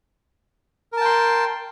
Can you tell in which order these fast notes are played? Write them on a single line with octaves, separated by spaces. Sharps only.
A#4 A5 G5 C6